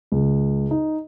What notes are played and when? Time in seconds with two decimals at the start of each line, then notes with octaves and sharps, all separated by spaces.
0.12 C#2
0.71 D#4